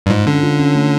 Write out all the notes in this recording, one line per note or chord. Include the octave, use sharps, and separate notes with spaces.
G2
G#2 F4
D3 C#4
F4
C#4
A3